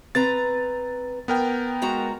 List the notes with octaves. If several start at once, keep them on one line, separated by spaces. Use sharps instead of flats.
C4 B4 A#5 A6
B3 A#4 G5
G#3 F#4 A#5